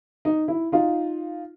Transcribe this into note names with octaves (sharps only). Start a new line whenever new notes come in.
D#4
E4
D#4 F4